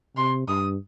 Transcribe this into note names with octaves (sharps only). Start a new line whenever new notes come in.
C3 C6
G2 D#6